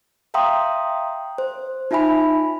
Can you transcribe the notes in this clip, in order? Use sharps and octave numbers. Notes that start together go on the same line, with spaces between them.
E5 F5 G5 A#5 C6 D#6
C5
D#4 F4 E5 G#5 B5